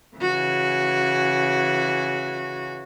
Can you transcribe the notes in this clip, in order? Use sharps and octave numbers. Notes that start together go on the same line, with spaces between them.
C#3 E3 F#4